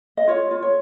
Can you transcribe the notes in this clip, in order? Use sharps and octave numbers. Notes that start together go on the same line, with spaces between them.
D#5
F4 C#5
F4
C#5